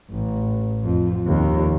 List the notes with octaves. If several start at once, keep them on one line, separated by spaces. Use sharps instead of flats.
A1
F2
D#2